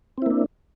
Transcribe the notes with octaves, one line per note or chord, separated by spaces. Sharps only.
A#3 C4 D4 E4